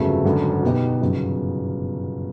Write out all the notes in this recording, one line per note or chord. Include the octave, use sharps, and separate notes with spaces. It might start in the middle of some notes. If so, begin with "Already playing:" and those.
Already playing: G1 F2 C#3 F#3 A3
G#1 F#2 D3
B2 F#3 B3 D#4 G4
G1 F#2 C#3